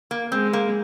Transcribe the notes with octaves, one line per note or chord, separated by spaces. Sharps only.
A#3
G#3 C4
A#3